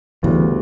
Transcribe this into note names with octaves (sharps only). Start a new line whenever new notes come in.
D2 C#3 E3 G3 B3